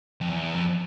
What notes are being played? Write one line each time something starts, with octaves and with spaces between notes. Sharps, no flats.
F2
E2
F2